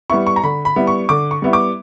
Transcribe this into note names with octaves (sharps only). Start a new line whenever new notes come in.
G3 B3 E4 C#6
C#6
A#5
D3 B5
B5
G3 B3 E4
C#6
D3 D6
C#6
G3 B3 E4
D6